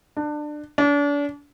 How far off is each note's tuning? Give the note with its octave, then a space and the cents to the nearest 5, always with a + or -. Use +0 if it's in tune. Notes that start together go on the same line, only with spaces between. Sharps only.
D4 +25
D4 -35